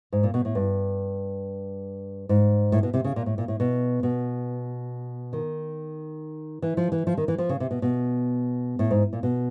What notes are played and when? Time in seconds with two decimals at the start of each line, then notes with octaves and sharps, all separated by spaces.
0.13 G#2
0.23 A#2
0.34 B2
0.45 A2
0.55 G2
2.29 G#2
2.72 A2
2.83 B2
2.94 C3
3.04 C#3
3.16 A#2
3.26 A2
3.38 A#2
3.48 A2
3.60 B2
4.03 B2
5.33 D#3
6.62 E3
6.77 F3
6.92 E3
7.07 F3
7.17 D#3
7.28 E3
7.38 F3
7.49 C#3
7.60 C3
7.71 B2
7.82 B2
8.79 A2
8.91 G#2
9.13 A#2
9.23 B2